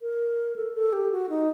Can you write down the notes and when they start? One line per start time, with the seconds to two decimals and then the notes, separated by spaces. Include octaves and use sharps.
0.02 A#4
0.56 A4
0.74 A4
0.93 G4
1.12 F#4
1.29 D#4